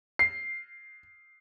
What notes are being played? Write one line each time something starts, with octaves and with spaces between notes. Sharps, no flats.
C7